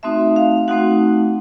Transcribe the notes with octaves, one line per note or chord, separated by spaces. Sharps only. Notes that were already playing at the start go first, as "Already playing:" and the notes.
A3 C4 D#4 F#4 E5
F5
A3 C4 D#4 F#4 F#5